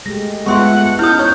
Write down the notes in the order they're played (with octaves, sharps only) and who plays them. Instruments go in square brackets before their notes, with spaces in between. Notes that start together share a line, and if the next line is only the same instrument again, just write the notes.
[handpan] G#3 A3 G4 [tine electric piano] A#6
[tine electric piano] G#3 F4 [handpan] B3 A4 [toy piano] E5 C6 C#6 [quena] F#5
[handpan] C#4 D#4 [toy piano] E4 D#6 [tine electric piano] F6 [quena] G6
[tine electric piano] C#5 F#6